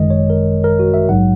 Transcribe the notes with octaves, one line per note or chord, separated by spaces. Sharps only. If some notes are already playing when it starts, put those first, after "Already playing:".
Already playing: G#1 F#2 D#3 G#3 D#5
C#5
A#4
A#4
F#4
E5
A#1 G#2 F#3 F#5